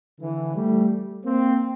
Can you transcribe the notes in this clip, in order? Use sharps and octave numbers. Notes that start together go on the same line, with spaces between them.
D3 E3
G3 A3
A#3 C4